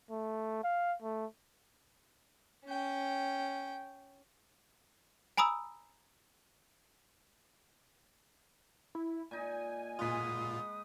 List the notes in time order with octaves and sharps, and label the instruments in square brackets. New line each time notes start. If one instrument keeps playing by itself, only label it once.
[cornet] A3
F5
A3
[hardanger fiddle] C#4 G5
[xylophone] G#5 A#5 B5 D#6 E6
[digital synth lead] E4
[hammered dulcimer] A#2 D#4 [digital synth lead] G#5
[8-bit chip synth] A#2 F4 [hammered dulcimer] G#3 F#5 B5 [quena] D#6